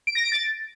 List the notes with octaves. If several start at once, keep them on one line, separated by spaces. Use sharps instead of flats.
D7
A#6
D7
A6